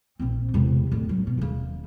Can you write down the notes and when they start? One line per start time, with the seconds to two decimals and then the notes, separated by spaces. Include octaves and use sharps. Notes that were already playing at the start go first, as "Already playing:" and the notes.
0.20 A#1 C4
0.54 E1 C3
0.92 D1 D3
1.09 F#3
1.27 B2
1.39 D#1 C#3